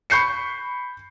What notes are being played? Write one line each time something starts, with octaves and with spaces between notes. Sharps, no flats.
B5 C#6 G6 C7 C#7